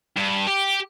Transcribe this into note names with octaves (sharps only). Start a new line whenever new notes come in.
G2
G4